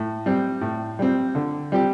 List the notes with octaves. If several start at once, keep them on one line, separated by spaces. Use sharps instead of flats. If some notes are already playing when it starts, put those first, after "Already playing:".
Already playing: A2
G3 C4
A2
G3 C4
D3
G3 C4 G4